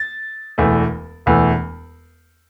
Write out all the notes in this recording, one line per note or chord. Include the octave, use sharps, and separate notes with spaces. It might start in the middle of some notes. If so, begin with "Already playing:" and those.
Already playing: A6
E1 E2 E3 A3
E1 E2 E3 A3